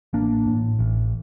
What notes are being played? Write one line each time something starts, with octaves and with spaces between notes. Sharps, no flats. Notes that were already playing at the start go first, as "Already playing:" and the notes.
A1 A#3 D4
A2
A1